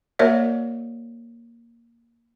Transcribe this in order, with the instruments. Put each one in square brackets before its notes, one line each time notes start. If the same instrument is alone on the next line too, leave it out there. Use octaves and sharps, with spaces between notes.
[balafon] A#3 F#4 A#4 C#5 D5 E5